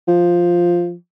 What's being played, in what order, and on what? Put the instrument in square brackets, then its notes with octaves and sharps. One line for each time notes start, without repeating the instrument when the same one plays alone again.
[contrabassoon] F3